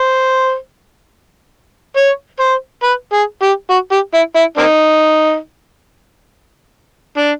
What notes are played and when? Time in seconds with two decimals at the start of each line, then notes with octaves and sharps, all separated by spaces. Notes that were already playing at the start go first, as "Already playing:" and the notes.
Already playing: C5
1.96 C#5
2.40 C5
2.83 B4
3.13 G#4
3.42 G4
3.70 F#4
3.92 G4
4.14 E4
4.36 E4
4.57 A#3 C4 D#4
7.17 D4